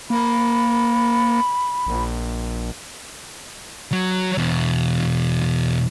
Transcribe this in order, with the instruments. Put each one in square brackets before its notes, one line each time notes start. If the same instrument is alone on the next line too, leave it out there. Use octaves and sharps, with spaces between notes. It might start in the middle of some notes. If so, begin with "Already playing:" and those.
[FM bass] A#3 [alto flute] B5
[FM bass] A#1
[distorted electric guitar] F#3
E2 B2